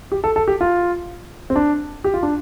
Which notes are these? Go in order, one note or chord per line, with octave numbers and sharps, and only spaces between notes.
G4
A4
A4
G4
F4
C4
D4
G4
F4
D4